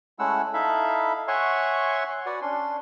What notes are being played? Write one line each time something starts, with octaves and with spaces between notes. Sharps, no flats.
G#3 A3 C#4 E4 F#5 E6
D#4 E4 A4 E5 F5 B5
C#5 E5 F#5 G#5 C6 C#6
F#4 B4 D5 F#5
C#4 D4 C6